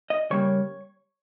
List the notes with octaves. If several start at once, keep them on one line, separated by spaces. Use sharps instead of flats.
D#5
C#3 G3 A#3 C#5